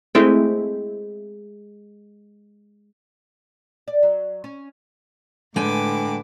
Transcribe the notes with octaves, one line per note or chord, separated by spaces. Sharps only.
G#3 A3 C4 E4 G5
D5
F#3
C#4
A2 D3 G#3 B4 G5 G#5 D6